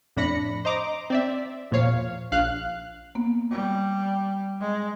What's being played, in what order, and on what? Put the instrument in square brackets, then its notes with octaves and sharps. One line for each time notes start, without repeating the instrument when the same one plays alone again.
[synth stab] F2 A2 D4 B5 A#6 C#7
C5 D#5 A#5 D6
C4 D5 E5
E2 A#2 F3 C#5 F5
A#1 F5 F#6
[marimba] A#3 B3
[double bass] G3
G#3